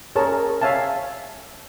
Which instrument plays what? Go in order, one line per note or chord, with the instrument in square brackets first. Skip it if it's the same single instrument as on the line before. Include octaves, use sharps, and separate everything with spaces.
[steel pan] G#4 A#4 C#5 A5
C#5 E5 F5 G#5 A5